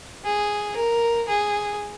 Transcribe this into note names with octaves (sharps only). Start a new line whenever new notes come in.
G#4
A#4
G#4